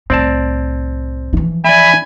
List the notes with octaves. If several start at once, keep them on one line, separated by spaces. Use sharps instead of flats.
C2 A2 C4 D5 A5
E3 F3
D5 E5 G#5 B5